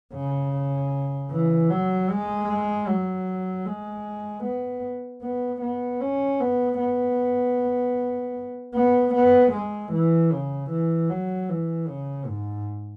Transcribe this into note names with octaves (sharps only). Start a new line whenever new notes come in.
C#3
E3
F#3
G#3
F#3
G#3
B3
B3
B3
C#4
B3
B3
B3
B3
G#3
E3
C#3
E3
F#3
E3
C#3
G#2